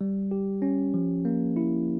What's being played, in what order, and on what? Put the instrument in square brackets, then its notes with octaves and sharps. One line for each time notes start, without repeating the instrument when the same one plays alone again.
[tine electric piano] G3
G4
C#4
F3
A#3
E4